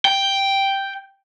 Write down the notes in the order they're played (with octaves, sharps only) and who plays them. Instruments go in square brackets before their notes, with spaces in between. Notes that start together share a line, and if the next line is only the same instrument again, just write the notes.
[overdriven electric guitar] G5